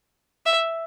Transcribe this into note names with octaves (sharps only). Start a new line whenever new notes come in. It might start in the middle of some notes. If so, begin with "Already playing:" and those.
E5